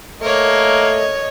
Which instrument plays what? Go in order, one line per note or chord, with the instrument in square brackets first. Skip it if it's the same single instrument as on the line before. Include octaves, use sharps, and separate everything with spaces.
[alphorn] A3 [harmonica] A#3 A#4 [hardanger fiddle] C#5 [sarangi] D#5